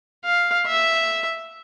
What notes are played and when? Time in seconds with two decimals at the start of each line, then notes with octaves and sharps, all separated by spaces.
0.24 F5
0.67 E5